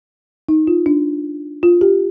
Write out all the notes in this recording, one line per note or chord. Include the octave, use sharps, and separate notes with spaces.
D#4
F4
D4
F4
G4